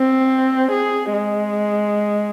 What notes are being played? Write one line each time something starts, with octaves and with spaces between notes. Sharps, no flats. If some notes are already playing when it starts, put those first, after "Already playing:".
Already playing: C4
G#4
G#3